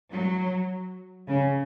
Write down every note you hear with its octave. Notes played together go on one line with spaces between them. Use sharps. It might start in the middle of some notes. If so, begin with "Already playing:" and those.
F#3
C#3